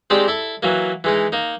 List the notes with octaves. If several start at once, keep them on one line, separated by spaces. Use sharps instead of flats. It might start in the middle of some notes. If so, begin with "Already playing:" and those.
G#3 C4 D#4 G4 D5
E4 A4
E3 F#3 A#3
E3 G#3 D#4
A#3 D#4